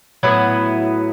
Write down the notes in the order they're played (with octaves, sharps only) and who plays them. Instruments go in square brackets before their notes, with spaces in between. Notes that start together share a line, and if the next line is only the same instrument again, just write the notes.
[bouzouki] A2 F#3 B3 E4